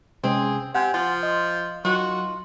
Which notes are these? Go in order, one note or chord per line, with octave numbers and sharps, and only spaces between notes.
C3 G#3 C4 C#4 G#4
C3 F#5 G#5
F3 F4
D#5
D#3 F#3 F4 F#4